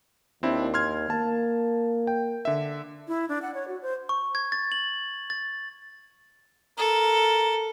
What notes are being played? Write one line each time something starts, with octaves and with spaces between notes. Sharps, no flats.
D#2 C4 D4 E4
C6 F6 G#6
A#3 A5
G5
D3 E5
E4
D4
F#5
C#5
F#4
C5
C#6
G#6
A6
F#7
A6
A4 A#4